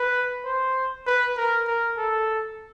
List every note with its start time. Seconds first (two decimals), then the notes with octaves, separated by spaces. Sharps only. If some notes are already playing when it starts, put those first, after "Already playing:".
Already playing: B4
0.45 C5
1.07 B4
1.37 A#4
1.67 A#4
1.97 A4